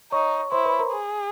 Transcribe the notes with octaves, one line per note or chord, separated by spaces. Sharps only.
D#4 C#5 C#6
E4 C5 C6
B4 B5
A#4 A#5
G#4